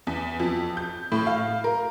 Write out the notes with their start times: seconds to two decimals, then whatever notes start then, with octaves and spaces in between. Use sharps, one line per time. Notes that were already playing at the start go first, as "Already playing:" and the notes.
0.07 E2
0.40 F2
0.77 G6
1.12 A2
1.27 F5
1.64 A#4